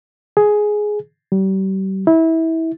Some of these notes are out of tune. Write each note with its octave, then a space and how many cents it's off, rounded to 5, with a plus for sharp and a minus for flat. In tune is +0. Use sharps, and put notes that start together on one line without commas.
G#4 +10
G3 -35
E4 -25